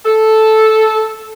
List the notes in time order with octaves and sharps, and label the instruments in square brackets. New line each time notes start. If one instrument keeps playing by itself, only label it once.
[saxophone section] A4